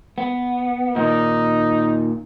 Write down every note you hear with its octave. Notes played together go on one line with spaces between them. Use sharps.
B3
A#2 D#3 D#4